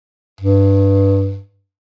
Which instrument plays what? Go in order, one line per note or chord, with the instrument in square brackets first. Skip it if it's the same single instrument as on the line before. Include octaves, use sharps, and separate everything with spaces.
[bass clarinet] G2